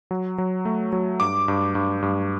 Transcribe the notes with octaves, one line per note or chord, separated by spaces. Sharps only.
F#3
F#3
A3
F#3
G2 D6
G2
G2
G2